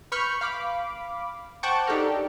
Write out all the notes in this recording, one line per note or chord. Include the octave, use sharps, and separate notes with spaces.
B4 B5 C#6 F6 G6
F5 B5 D6
C5 F#5 G5 A5 C#6 D6
D4 D#4 G4 A4 A#4